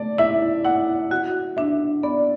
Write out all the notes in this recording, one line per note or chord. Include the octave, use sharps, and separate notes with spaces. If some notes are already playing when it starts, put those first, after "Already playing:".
Already playing: A3 D5
E4 E5
E4 F#5
F#4 F#5
D4 E5
B3 D5